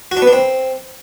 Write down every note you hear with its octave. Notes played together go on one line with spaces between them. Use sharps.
F#4
D4
B3
D4
C4